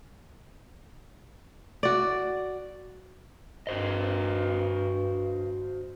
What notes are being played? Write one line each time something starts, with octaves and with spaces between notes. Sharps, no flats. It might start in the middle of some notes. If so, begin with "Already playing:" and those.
F#4 D5
G2 F#4 C5 D#5